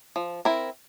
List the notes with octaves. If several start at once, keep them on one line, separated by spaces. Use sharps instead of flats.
F3
C4 E4 A#4